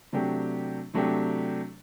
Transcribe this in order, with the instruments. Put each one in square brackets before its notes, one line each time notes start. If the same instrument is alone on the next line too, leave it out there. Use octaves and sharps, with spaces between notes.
[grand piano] C3 F#3 A3 D4 G4
C3 F#3 A3 D4 G4